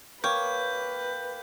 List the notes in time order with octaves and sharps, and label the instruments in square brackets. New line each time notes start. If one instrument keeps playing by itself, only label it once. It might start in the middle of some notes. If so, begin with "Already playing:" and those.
[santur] A#3 G5 [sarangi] B4 [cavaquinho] C#5 [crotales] G6